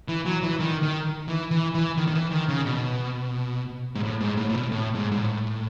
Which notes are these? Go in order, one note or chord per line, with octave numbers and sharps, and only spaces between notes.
E3
F#3
E3
D#3
D#3
E3
E3
E3
D#3
D#3
E3
D#3
C#3
B2
G#2
A2
G#2
A2
A2
B2
A2
G#2
G#2
A2